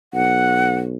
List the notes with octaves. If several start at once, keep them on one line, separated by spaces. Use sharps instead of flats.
B1 F#5